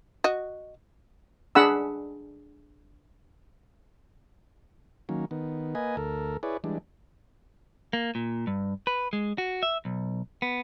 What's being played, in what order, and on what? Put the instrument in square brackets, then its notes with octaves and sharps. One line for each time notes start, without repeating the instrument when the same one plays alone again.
[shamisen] F#4 D#5
[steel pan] D4 G#4 F#5 B5 E6
[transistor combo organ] D#3 F#3 A#3 C#4
D#3 B3
A#3 B4 D#5 G#5
D2 A4 A#4
E4 G#4 B4 C#5 D5
E3 G3 G#3 D4
[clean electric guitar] A#3
A#2
G2
B4
G#3
F#4
E5
B1
B3